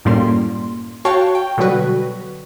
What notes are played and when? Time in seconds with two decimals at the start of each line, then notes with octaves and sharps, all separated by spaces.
0.05 F#2 A2 G3 A#3 C6
1.05 F#4 C#5 F5 G5 A5 C#6
1.35 G5
1.58 B2 D3 F#3 G3 F#4 B4